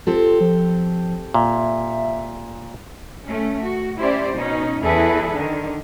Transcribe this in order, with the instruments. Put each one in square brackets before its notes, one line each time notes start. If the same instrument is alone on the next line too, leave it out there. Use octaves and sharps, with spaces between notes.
[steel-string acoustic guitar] C4 G4 A4 [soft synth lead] F4
[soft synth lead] F3
[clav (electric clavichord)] A#2 [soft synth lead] E5
[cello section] A3 C#4
F#4
C#4 E4 G4 C5 D5
B2 C#4 D#4
E2 E4 G#4 A4 B4
D3 D#3